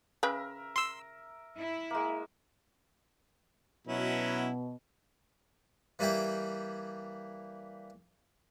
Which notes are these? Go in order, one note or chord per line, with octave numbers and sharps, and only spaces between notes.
C#3 A#4 B4 E5 G5
C6 E6
E4
G#3 A#3
B2 F#3 C#4 E4
E3 G3 A#3 E4 G5